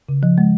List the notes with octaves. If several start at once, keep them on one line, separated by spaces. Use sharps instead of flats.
C#3
F3
G#3